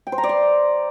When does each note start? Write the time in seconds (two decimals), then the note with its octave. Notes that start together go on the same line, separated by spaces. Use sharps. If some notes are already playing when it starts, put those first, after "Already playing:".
0.07 G5
0.12 C5
0.18 A#5
0.24 D5
0.29 C6